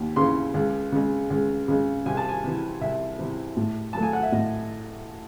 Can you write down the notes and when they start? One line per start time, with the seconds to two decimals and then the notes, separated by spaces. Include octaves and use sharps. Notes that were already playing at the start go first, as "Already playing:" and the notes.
Already playing: D#2
0.16 C#3 E3 C6
0.54 C#2
0.92 C#3 G#3
1.30 C#2
1.68 C#3 G#3
2.06 C2 G#5
2.17 A5
2.29 G#5
2.44 C3 E3
2.81 C2 E5
3.19 C3 E3
3.57 A2
3.93 F#3 A3 A5
4.03 G#5
4.13 F#5
4.23 E5
4.32 A2 D#5